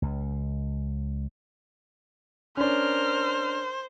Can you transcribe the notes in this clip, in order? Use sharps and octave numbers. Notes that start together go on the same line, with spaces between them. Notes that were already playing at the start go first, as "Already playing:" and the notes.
C#2
C#4 D4 A#4 C5 F6